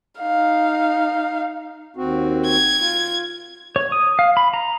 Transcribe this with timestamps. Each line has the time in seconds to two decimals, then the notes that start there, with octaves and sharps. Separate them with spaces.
0.20 D#4 F5
1.96 D#2 C4 F#4
2.46 G#6
2.80 F4
3.76 C#5
3.92 D#6
4.19 F5
4.37 B5
4.54 A#5